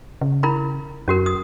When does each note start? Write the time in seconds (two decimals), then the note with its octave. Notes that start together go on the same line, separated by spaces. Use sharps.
0.21 C#3
0.43 E4 A#4 B5
1.08 F#2 C#4 F#4 A#4
1.26 D#6